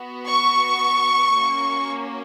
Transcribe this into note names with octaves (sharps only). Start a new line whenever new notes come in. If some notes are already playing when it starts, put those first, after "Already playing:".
Already playing: B3 F#4
C#6
A#3 C#4 F#4